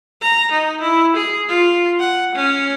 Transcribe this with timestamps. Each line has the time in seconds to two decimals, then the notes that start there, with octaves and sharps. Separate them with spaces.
0.22 A#5
0.52 D#4
0.81 E4
1.16 G#4
1.49 F4
1.99 F#5
2.35 C#4